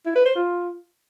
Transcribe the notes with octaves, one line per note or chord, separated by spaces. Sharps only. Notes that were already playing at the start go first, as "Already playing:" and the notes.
E4
B4
C5
F4